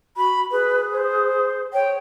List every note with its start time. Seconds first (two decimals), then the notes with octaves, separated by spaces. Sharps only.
0.17 F#4 B5
0.51 G#4 B4
0.93 C5
1.73 C#5 G5